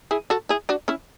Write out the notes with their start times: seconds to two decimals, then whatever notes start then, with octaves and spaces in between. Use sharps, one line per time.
0.11 E4 G#4
0.30 F#4 A4
0.49 E4 G#4
0.69 D4 F#4
0.88 C#4 E4